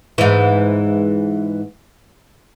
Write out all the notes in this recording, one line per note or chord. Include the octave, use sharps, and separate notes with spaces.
G#2 E3